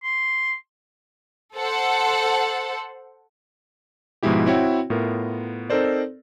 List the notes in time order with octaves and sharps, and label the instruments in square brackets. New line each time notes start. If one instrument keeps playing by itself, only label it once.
[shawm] C6
[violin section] A4 C5 F#5
[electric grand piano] G#2 B2 F3 G#3 E4 G4
C4 E4 F#4 C#5 G5
A2 B3 F4 A#4
C4 D#4 A4 A#4 C5 D5